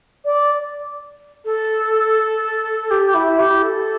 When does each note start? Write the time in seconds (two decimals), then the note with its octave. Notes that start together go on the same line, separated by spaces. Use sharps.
0.25 D5
1.45 A4
2.90 G4
3.14 E4
3.39 G4
3.62 A4